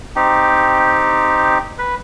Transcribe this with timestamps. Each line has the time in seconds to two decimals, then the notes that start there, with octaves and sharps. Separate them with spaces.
0.16 C4 D#4 G4
1.78 B4